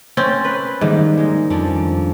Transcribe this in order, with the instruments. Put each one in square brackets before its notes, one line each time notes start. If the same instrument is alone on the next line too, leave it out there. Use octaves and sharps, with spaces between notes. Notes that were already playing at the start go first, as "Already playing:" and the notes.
[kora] C4 C#4 [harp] A6
[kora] B4
[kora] G#2 [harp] D#3 G3 A#3
[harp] G#3 D#4
F2 C#4 D4